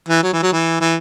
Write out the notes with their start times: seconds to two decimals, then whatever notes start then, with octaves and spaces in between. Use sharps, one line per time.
0.09 E3
0.23 F#3
0.33 E3
0.42 F#3
0.52 E3
0.81 E3